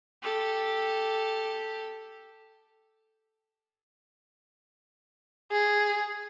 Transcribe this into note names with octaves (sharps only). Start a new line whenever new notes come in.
G4 A4
G#4